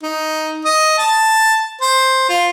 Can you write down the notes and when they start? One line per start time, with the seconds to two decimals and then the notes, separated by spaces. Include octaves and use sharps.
0.03 D#4
0.65 D#5
0.98 A5
1.81 C5
2.29 F4